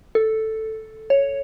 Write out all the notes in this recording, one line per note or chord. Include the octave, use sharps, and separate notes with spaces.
A4
C#5